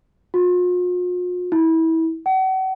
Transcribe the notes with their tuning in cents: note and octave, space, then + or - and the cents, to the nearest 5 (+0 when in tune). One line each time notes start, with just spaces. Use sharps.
F4 +45
E4 -25
F#5 +40